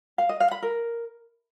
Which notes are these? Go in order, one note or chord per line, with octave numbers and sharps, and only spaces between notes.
F5
D#5
F5
B5
A#4